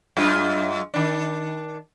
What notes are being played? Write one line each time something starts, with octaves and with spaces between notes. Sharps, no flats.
F#2 G#3 F4
D#3 D4